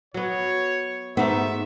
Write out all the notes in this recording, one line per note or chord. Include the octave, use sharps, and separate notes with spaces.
F#3 B3 C#5
G#2 A3 B3 D#4 E5